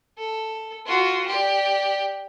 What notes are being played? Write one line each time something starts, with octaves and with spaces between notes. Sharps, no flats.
A4
F4 F#4
G4 D5